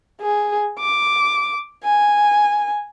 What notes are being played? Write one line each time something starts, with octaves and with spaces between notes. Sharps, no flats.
G#4
D6
G#5